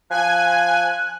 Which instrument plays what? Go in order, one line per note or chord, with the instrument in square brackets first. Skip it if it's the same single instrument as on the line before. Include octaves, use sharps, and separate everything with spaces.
[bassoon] F3 [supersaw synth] G#5 [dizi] F#6